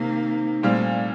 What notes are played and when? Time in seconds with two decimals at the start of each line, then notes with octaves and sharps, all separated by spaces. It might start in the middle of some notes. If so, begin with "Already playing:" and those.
Already playing: C3 D#3 A#3
0.63 A#2 G3 A3 C4